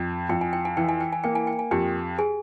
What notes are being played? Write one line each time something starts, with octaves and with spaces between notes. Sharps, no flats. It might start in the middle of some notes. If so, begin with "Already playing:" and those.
Already playing: F2
F2 G5
G#5
G5
G#5
E3 G5
G#5
G5
G#5
A#3 G5
G#5
G5
G#5
F2 G4 G5
G#4 G#5